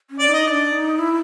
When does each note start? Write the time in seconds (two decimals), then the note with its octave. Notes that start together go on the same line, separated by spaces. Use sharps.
0.10 C#4
0.19 D5
0.28 D#4 D#5
0.46 D4 D#4 D5
0.72 D#4
0.98 E4